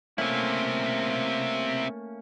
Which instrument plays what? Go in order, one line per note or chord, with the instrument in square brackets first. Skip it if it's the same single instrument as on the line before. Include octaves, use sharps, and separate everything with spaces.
[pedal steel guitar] A3 A#3 C#4 [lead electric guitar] C4 E4